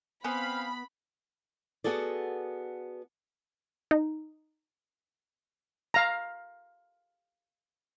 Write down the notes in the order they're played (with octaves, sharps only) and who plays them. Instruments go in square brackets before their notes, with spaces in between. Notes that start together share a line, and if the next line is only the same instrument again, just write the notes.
[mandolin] B3 [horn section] C4 F5 [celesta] G#5 [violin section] B5
[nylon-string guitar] B3 F#4 G#4 A4 D5
[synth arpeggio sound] D#4
[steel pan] F5 A#5